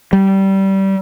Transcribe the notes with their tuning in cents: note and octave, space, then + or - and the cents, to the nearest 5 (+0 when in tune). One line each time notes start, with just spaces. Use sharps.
G3 -20